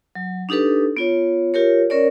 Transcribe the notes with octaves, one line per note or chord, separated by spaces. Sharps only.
F#3
D4 D#4 G4 A4 B4
B3 F4 C#5
F4 G4 A#4 C#5
C#4 A#4 C#5 D5